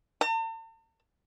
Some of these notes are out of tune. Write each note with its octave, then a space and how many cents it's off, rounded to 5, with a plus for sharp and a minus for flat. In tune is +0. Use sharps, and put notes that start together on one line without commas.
A5 +45